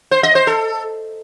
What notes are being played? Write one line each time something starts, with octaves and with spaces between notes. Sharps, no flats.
C5
D#5
C5
A4